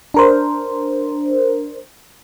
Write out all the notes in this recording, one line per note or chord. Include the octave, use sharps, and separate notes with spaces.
D4 A#4 C5